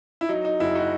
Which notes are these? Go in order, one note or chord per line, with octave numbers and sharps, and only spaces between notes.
E4
F#3 D#4
D#4
F#1 E4
D#4 F#4